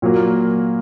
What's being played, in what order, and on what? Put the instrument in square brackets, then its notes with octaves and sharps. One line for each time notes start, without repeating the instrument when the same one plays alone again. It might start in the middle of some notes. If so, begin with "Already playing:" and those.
[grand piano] A#2 F#3 A#3